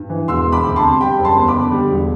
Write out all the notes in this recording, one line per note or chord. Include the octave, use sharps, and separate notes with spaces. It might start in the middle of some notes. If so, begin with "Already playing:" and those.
Already playing: G2
E3
E1 C6 E6
E1
B5 D6
D2
A5 C6
C3
G3 G5 B5
F#1
A5 C6
E2
B5 D6
D3
G3
E1